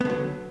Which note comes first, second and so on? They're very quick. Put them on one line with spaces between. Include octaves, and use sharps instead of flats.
B3 D3 F#3